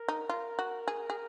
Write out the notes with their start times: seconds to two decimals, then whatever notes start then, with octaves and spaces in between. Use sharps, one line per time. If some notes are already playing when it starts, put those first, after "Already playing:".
Already playing: A#4
0.08 D#4
0.29 F4
0.59 F#4
0.88 G#4
1.10 G#4